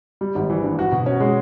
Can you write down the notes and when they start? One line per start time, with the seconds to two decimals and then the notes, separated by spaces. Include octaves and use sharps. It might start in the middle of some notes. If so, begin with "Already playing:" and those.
0.21 G3
0.35 G#1
0.50 E3
0.64 G2
0.79 F#4
0.92 B2
1.06 C#4
1.20 G#3